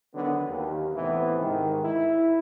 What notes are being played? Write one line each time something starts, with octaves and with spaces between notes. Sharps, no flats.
D3 D#3 F#3 B3
D#2
A2 C3 E3 B3 E4
G#2 D#3
E4